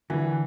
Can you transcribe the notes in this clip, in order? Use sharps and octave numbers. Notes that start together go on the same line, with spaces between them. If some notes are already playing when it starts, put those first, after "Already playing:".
D3 E3